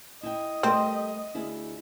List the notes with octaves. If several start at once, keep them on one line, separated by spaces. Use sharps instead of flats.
E4 D#5 G5
G3 A3 C4 A#4
D2 E4 G#4